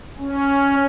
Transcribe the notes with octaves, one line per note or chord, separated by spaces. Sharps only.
C#4